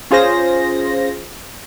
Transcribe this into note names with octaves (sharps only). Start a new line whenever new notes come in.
C#4 F4 G#4 C5 A#6